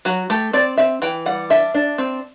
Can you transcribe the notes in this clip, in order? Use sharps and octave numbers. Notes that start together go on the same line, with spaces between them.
F#3 F#4
A3 G4
C4 D5
C4 E5
E3 G5
G3 F#5
D4 E5
D4
C4